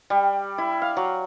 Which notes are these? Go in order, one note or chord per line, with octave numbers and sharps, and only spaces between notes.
G3
E4
F5
F#3